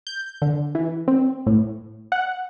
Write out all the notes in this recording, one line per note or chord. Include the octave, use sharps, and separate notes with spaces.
G6
D3
E3
C4
A2
F#5